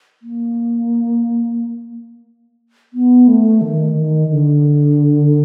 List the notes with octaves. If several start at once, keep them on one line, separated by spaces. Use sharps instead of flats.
A#3
B3
A3
D#3
D#3
D3